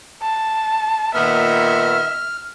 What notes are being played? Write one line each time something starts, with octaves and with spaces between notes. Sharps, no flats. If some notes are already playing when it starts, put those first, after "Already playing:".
A5
A#2 D#3 B3 E5 F6